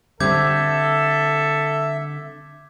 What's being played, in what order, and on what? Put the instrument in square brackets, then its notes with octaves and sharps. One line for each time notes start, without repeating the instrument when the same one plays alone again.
[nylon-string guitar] D3 G3 C4 [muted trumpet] A4 [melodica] E5 [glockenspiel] D6 G6 G#6